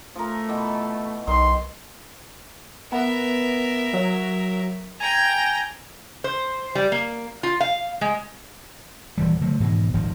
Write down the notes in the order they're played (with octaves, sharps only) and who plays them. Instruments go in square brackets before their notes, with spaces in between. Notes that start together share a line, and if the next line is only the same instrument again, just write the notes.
[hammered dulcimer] F3 A#4 [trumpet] A3
[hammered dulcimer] B2 E3
[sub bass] B1 [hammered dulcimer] D#3 [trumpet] C6
[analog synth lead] B3 [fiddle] A#4 E5
[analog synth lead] F#3
[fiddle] G5 A#5 [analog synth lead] G#5
[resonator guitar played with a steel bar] C5
G3
A#3
F4
F5
G#3
[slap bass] D#1 E3 G3
D3 F3 F#3 A3
G#2 B2 D#3 E3
D#1 G#1 D#3 F3